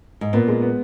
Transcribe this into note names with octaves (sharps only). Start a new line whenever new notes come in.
G#2
A#2 B3
G#3
B3